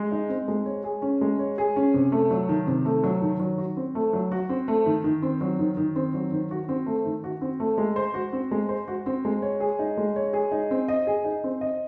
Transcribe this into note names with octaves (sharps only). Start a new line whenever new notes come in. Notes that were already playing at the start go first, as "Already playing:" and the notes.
Already playing: G#3
D#4
C4
G#3
C#5
G#4
C#4
G#3
C#5
G#4
C#4
C3
A3
F#3
D#3
C3
A3
F#3
D#3
F#3
F#4
C4
A3
F#3
F#4
C4
A3
D#3
D#3
C4
F#3
D#3
D#3
C4
F#3
D#3
F#4
C4
A3
D#3
F#4
C4
A3
G#3
C5
F#4
C4
G#3
C5
F#4
C4
G#3
C#5
G#4
D#4
G#3
C#5
G#4
D#4
C4
D#5
G#4
D#4
C4
D#5